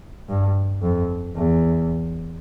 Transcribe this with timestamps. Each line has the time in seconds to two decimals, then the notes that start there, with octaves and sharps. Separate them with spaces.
0.29 G2
0.82 F2
1.36 E2